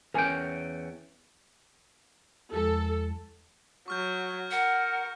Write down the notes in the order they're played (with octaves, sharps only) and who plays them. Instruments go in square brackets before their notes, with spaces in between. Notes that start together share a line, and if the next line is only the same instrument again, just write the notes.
[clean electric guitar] E2 C#4 G5 [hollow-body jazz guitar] A#4 G#5
[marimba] E2 F3 G#3 [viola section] A4
[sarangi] F#3 [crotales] C#6 F6 G6
[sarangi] A#4 [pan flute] F#5